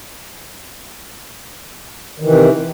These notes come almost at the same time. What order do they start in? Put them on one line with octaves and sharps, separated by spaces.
D#3 E3 C3